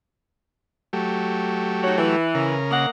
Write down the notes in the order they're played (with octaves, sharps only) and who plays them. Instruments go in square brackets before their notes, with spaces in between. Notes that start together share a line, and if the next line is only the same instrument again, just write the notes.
[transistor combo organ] F#3 A3 G4
[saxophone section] D#4 F#4 C#5
E3
[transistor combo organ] C#3 A#4
[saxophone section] A#3 D#5 F#5